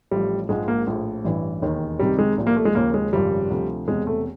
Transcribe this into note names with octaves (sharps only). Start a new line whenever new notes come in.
A1 A2 F3 G3
A#1 G#2 F3 G#3
A#3
A#1 A2 F3
A1 G2 E3
E1 D#2 D#3
C#2 C3 D#3 G3
G#3
C2 A#2 F3
A#3
A3
G#3
D#2 C#3 F3 A#3
G#3
G#1 F#2 C#3 F3 G3
D2 C3 F3
E1 E2 C3 G#3
A3